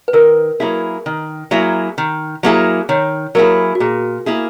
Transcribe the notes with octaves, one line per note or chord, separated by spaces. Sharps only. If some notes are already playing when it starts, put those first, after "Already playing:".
B4
D#3 A#4
F#3 A#3 E4 G#4
D#3
F#3 A#3 E4 G#4
D#3
F#3 A#3 E4 G#4
D#3 C#5
F#3 A#3 E4 G#4 A#4
F#4
A#2 G#4
A#3 E4 G#4